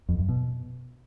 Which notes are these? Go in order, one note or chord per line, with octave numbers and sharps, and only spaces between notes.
F2
F#2
B2